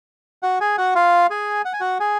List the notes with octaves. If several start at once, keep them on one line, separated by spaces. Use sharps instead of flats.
F#4 F#5
G#4 G#5
F#4 F#5
F4 F5
G#4 G#5
F#5
G#5
F#4 F#5
G#4 G#5